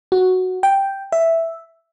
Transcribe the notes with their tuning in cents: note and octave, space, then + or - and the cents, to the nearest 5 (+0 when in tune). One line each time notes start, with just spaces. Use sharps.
F#4 +0
G5 +0
E5 +0